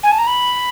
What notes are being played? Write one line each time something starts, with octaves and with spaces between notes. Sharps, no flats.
G#5
A5
A#5
B5